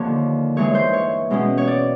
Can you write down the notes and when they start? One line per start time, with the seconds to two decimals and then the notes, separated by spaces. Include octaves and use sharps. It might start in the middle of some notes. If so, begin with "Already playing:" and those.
Already playing: D#2 D3 F3 A#3 C#5
0.56 G2 E3 G#3 C#5
0.75 C5
0.93 C#5
1.30 B2 G#3 C#4
1.58 C#5
1.68 D5